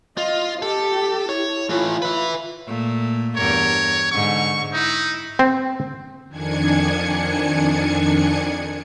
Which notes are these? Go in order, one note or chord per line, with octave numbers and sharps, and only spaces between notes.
F4 D#5
G4 A4
E4 C#5
E3 A3 F4
B4 E5
A#2 A3
E2 G2 A#4 C#5
G#2 D3 C#6
D#4 E4
C4
F2 D#3 D4 G#5 G#6 C#7